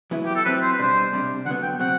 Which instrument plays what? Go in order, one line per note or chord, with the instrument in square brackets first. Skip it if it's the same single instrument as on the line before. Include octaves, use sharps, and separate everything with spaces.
[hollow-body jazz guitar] F#3 B3 E4
[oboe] G4
A4
[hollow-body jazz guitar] F#3 C4 E4 [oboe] B4
[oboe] C5
B4
[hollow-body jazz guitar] B2 G3 D4 [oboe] C5
[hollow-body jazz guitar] C3 G3 D4
[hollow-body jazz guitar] D3 F#3 B3 [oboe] F#5
[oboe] G5
[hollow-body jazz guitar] C3 F#3 C4 [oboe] F#5